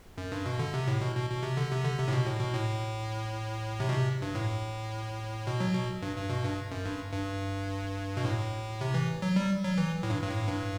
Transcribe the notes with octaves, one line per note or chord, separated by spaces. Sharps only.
F#2
G2
B2
D3
C3
A2
B2
B2
B2
C3
D3
C3
D3
C3
A2
B2
A2
B2
A2
C3
B2
C3
G2
A2
B2
F#3
B2
G2
G2
B2
G2
F#2
G2
G2
B2
A2
C3
E3
F#3
G3
F#3
E3
A2
G2
G2
A2
G2